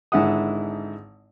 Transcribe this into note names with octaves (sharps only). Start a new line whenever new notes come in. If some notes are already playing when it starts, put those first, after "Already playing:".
G#1 G#2 D3 E4 F#5 D#6